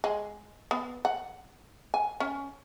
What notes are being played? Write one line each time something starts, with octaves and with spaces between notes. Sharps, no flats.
G#3
B3
F#5
G#5
C#4